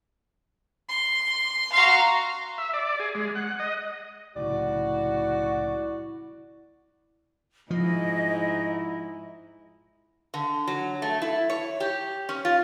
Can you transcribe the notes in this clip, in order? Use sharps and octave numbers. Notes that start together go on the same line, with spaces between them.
C6
F#4 F5 A#5 C6
E5
D5
G#4
G#3
F#5
D#5
C2 A2 C#3 E4 F#4 D5
G#2 F3 E4 D#5
D3
F#3
A3
E4
C#5
G4
C#4
F4